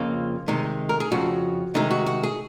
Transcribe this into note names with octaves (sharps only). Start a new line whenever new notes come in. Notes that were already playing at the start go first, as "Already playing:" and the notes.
Already playing: F2 C#3 F3 A#3 F4
C3 D#3 G#3
A#4
G#4
F2 C#3 F3 F#4
C3 D#3 G#3 D#4
F#4
F#4
G#4